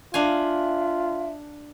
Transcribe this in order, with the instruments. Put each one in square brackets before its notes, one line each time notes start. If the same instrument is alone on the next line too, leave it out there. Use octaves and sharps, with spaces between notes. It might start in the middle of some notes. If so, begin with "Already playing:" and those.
[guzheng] D4 F5 G#5 [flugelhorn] F4 [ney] E5